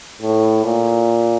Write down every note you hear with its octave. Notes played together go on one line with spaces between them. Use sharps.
A2
A#2